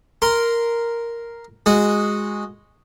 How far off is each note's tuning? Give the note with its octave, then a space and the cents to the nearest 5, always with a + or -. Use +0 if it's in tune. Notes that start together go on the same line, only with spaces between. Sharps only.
A#4 +0 C6 -10
G#3 -5 F#4 -10